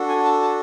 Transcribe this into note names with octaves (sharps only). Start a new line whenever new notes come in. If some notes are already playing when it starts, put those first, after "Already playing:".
Already playing: D4 F#4 A4
G#5
A5
A5